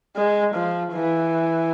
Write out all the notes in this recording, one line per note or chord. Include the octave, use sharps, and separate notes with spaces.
G#3
F3
E3